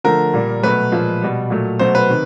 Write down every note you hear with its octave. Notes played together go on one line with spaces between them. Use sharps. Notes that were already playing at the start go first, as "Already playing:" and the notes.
D3 F3 A3 A#4
A#2 G3
B2 F#3 A3 B4
A#2 F3 G#3
B2 G3
A#2 F#3 A3
B2 F#3 A3 C5
B4
C3 D#3